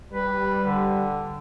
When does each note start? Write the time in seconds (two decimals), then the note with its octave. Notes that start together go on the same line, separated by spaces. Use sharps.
0.13 G3 B4
0.65 D3